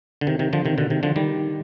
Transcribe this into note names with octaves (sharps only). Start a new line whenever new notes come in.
D3
C3 D#3
C3 D#3
D3 F3
C3 D#3
B2 D3
C3 D#3
D3 F3
D#3 G3